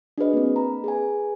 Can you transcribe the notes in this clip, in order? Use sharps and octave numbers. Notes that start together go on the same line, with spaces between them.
D4 F#4 G#4 B4 D#5
A#3 C4
A#5 B5
G#4 B4 G#5